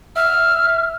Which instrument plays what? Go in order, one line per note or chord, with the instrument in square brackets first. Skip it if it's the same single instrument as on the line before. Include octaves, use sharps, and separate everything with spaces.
[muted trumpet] E5 [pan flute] F6